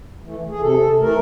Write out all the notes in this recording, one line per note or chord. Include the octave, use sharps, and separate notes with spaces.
E3 A3
G#4
C3 A4
E3 A3 A#4